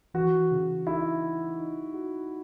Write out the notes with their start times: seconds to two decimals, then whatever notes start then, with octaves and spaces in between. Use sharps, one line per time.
0.14 E3 F#4
0.51 C#3
0.87 D#4 E4
1.23 D#4
1.59 D#4
1.94 F#4